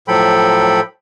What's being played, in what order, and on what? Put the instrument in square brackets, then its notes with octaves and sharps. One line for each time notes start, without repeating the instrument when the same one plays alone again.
[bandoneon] A2 F3 F#3 A4 G5 B5